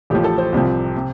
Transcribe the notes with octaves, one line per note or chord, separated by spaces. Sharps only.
A1 A2 F3 G4
A4
C5
C2 C3 F3
C3